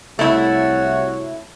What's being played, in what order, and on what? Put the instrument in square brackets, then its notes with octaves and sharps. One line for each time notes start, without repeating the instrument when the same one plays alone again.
[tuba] C2 [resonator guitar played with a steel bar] A3 E4 [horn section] F#4 C#5 [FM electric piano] E5